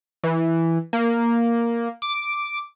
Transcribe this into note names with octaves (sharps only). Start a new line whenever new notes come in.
E3
A#3
D6